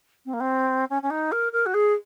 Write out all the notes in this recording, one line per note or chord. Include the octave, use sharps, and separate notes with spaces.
C4
A#3
C4
C#4
C#4
D#4
A#4
A#4
F#4
G#4